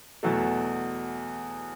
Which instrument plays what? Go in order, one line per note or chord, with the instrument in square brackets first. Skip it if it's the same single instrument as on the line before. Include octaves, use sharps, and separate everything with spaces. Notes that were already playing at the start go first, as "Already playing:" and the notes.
[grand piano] E2 B2 F#3 A3